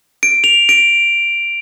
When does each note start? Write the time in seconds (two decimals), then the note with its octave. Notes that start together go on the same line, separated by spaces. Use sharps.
0.23 D7
0.44 F7
0.69 D7